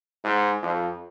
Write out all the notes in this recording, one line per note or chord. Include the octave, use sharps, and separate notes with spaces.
G#2
F2